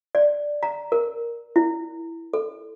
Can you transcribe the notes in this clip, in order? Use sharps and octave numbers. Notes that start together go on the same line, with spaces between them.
D5
A#5
A#4
E4
A4